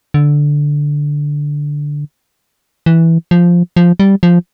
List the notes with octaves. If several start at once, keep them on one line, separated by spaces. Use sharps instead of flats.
D3
E3
F3
F3
G3
F3